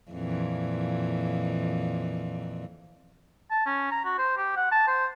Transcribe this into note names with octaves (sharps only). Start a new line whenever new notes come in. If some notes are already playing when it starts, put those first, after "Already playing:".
F2 A#2 E3
A5
C#4
A#5
F#4
C5
G4
F#5
A5
C5